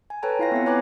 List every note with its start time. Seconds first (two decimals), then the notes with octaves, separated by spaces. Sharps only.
0.10 G#5
0.23 A4 B4 C#5 G5 A5 A#5
0.39 E4 F4 F5 G#5 A#6
0.52 B3 C4 E5 F#5
0.66 B4 C#5 G#5 A#5 D6 F#6